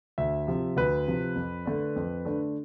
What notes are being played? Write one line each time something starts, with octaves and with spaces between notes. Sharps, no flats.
D2 E5
C3 F3
D2 B4
C3 F3
F2
D3 A3 D4
F2
D3 A3 D4